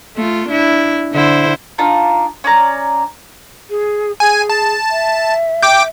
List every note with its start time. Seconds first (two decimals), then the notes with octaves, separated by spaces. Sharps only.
0.16 A3 F4
0.48 D4 E4
1.12 D3 E4 C5
1.78 D4 D#4 F4
2.44 C#4 D5 A#5
3.69 G#4
4.20 G#4 G#5
4.49 A5
4.90 E5
5.63 G5 D6